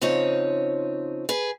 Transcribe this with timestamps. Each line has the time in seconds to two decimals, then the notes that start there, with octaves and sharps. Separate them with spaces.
0.01 C#3 F3 C4 D#4 C#5
1.29 G#4 B4